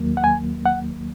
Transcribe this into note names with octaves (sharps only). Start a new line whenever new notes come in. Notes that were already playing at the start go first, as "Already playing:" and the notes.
Already playing: D#2 D#3 F#3 A#3
F#5
G#5
F#5